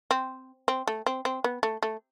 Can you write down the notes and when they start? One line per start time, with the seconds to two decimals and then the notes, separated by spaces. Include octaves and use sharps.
0.11 C4
0.68 C4
0.87 A3
1.06 C4
1.25 C4
1.44 B3
1.63 A3
1.83 A3